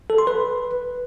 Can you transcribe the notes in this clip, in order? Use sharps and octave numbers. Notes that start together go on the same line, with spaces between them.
A4
C6
B4